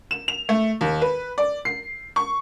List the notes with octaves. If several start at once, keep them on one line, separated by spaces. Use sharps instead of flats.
E7
F7
A3
D#2
B4
D5
C7
C#6